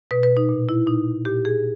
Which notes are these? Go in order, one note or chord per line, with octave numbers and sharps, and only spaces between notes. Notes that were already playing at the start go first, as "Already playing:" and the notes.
B2 B4
B4
D#4
A#2
E4
A#2 D#4
A#2 G4
G#4